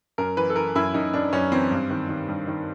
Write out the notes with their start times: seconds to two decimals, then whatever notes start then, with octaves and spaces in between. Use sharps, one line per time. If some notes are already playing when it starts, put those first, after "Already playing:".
0.18 F#2 A#4
0.37 E3 B4
0.50 A4
0.56 E3 A#4
0.75 F#2 E4
0.94 F#2 D#4
1.13 F#2 D4
1.33 F#2 C#4
1.52 E3 C4
1.71 G2
1.90 D#3
2.09 D#3
2.28 G2
2.47 D#3